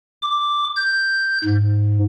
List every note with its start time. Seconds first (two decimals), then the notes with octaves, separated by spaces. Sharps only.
0.22 D6
0.76 G6
1.45 G#2